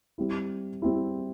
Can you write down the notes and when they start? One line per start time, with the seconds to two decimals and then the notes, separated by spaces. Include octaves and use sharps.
0.18 G3 C4 E4
0.82 G3 C4 E4